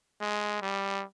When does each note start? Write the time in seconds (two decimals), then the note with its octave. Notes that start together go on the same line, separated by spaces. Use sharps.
0.21 G#3
0.62 G3